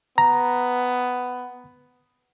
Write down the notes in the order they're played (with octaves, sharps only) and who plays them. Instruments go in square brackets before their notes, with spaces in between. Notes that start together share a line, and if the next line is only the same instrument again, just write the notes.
[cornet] B3 [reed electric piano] A#5